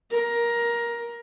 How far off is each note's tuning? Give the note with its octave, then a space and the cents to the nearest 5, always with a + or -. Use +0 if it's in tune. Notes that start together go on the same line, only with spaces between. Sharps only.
A#4 +15